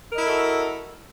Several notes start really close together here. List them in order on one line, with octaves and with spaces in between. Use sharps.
A#4 D#5 E4 A4 F#4